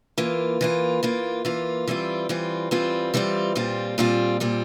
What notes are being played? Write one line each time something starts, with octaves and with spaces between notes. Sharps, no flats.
E3 A#3 F4
E3 A#3 F4
E3 A#3 F4
E3 A#3 F4
E3 G3 C4 F4
E3 G3 C4 F4
E3 G3 C4 F4
E3 G3 C4 F4
A#2 G3 C4 F4
A#2 G3 C4 F4
A#2 G3 C4 F4